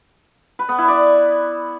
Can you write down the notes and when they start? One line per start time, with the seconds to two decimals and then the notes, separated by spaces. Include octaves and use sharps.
0.59 B4
0.69 B3
0.78 E4
0.88 D5